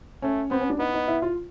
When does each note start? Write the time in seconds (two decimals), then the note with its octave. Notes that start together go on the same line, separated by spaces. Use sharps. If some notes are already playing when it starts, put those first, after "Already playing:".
0.22 A3 C#4
0.50 B3 C4
0.61 C#4
0.70 D4
0.79 B3 D#4
0.94 D#4
1.08 E4
1.22 F4